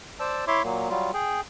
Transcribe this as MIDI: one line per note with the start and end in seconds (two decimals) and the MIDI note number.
0.20 0.45 72
0.20 0.45 74
0.20 0.45 81
0.20 0.45 88
0.47 0.62 64
0.47 0.62 73
0.47 0.62 76
0.47 0.62 84
0.47 0.62 86
0.63 0.89 46
0.63 0.89 54
0.63 0.89 58
0.90 1.11 54
0.90 1.11 55
0.90 1.11 65
1.14 1.41 68
1.14 1.41 79